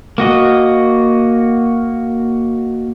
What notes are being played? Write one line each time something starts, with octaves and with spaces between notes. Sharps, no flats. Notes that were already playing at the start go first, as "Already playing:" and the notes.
A#3 F#4 D#5